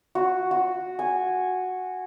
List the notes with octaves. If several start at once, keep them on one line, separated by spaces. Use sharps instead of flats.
F#4
F#4
G#5